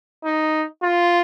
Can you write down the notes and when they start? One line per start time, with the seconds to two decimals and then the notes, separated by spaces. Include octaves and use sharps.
0.25 D#4
0.83 F4